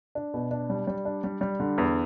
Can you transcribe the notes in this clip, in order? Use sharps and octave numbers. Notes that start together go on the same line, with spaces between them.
D4
B2
D4
G3
G3
D4
G3
G3
D3
E2